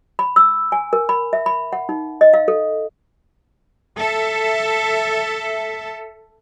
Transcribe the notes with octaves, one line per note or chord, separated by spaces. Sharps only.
B5
E6
G#5
A#4
B5
E5
B5
F#5
D#4
D#5
F5
A4
A4 E5